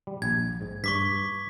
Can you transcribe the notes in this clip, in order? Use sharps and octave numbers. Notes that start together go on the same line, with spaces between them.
G3
A#1 G#6
G#2
G2 C#6 D6 B6